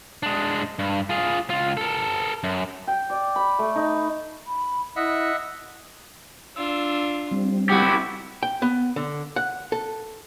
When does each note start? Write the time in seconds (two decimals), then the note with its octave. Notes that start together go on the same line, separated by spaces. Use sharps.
0.23 G#3 D4
0.79 G2
1.10 F4 G#4
1.50 C#2 F4
1.77 A4 A#4
2.44 F#2
2.87 G5
3.10 D5
3.36 B5
3.59 A3
3.76 D#4
4.47 B5
4.96 E4 D#5 E5 F#5
6.56 D4 F4 E6
7.31 G3 C4
7.69 E4 F#4 G4
8.43 G5
8.62 B3
8.96 D3
9.36 F#5
9.72 A4